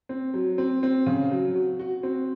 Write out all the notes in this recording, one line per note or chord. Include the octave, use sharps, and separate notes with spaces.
C4
F#3
C4
C4
C#3
F#3
F#4
F#4
C4